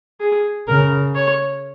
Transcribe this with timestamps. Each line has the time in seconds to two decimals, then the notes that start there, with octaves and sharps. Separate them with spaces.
0.20 G#4
0.68 C#3 A#4
1.15 C#5